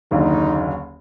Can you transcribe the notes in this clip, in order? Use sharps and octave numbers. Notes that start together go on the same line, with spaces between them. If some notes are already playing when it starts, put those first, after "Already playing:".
F#1 D#2 D3 D#4